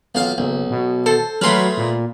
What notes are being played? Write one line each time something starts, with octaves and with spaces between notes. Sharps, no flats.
B1 F4 F5
F#1 B1
B2
A4 C5
F#3 A3 G#4 B4 B5 C6 F6
A#2